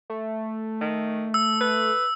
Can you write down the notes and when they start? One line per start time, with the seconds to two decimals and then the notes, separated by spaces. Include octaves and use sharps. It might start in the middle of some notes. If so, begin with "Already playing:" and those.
0.10 A3
0.81 D#3
1.34 E6
1.61 B4